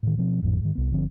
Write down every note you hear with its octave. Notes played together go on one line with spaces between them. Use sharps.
A2 D#3
B2 F3 C4
G#1 F2 A2 F3
G#2 D#3
C2 B3
G1 D3 F3 C4